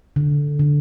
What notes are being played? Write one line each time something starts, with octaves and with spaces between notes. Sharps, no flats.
D3
D3